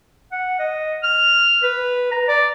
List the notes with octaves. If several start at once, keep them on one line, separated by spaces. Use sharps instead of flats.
F#5
D#5
F6
B4
A#5
D5